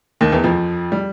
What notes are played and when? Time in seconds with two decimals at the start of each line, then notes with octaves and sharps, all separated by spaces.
0.21 D#2 D#3
0.32 E2 E3
0.44 F2 F3
0.92 G3